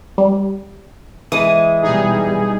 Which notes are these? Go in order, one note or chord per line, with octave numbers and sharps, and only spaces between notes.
G3
E3 G#3 D#6
B2 G3 D#4 G#4